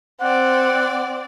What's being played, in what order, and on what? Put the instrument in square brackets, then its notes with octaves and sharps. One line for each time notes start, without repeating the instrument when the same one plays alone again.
[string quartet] C4 D5 [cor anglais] F#5